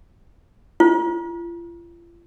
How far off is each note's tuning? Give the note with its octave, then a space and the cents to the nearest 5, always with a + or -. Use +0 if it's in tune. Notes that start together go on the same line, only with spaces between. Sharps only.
F4 -40